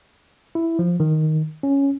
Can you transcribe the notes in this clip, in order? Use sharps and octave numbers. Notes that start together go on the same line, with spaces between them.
E4
F3
D#3
C#4